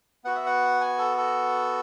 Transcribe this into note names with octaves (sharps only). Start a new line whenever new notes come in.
B3 F#4 F#5
E5
F#5
G#5
A4
A4